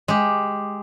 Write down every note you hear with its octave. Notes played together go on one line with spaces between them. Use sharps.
G#3 G4